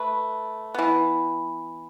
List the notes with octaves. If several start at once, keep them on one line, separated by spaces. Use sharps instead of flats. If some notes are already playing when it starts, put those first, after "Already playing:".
Already playing: A3 B4
E3 B3